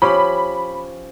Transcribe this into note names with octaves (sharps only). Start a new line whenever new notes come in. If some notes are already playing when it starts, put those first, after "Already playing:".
F3 C#4 G4 B5